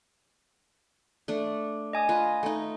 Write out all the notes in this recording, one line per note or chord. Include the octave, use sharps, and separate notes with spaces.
A3 D4
D#5 G#5 D#6
F4 B4
A3 D#4